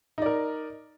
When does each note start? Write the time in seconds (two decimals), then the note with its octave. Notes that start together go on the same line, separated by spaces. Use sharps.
0.18 D#4
0.22 D5
0.26 A#4